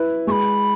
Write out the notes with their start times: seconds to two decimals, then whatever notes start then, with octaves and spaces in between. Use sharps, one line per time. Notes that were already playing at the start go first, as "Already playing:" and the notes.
Already playing: E4 B4
0.27 G#3 C#6
0.31 B5